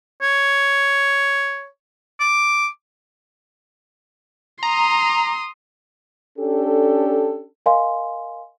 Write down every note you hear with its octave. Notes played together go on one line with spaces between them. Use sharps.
C#5
D6
A#5 C6 D#6
C#4 D4 G4 A4
A#4 D#5 F5 G#5 C6